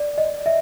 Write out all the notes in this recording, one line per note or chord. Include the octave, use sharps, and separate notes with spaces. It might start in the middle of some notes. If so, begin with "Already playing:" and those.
Already playing: D5
D#5
E5